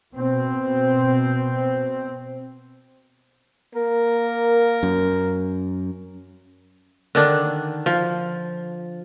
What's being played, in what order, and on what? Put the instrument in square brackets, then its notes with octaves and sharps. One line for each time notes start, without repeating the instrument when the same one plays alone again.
[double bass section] B2 C4
[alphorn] A#3 [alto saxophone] A#4
[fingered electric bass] F#2
[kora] D3 D#3 D4
F3